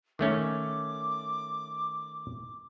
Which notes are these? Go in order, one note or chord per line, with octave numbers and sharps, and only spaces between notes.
D#3 A3 C#4 D6